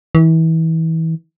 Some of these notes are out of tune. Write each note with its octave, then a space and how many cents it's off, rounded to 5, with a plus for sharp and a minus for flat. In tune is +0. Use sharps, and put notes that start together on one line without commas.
E3 -30